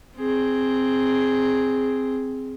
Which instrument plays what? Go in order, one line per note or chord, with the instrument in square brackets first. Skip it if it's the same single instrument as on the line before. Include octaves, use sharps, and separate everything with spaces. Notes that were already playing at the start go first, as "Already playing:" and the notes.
[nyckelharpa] C4 G#4